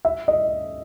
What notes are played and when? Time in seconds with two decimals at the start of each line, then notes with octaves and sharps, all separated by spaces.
0.05 E5
0.28 D#5